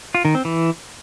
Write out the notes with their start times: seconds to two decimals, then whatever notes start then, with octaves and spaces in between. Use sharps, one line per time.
0.15 F4
0.25 D#3
0.35 C4
0.45 E3